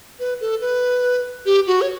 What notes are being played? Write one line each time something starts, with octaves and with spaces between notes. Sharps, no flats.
B4
A4
B4
G4
F#4
C#5